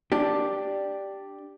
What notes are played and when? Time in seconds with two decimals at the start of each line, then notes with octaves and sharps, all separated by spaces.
0.12 D4 G4